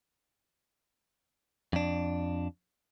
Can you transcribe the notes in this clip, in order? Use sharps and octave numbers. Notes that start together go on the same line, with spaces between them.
F2 D4